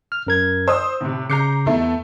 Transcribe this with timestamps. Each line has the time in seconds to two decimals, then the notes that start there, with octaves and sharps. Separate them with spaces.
0.12 F6
0.27 F#2 A#4 G#6
0.68 C5 D#6 E6
1.01 A2 C3
1.30 C#3 A#5 D6 G6 C7 C#7
1.66 E2 A3 B3 E4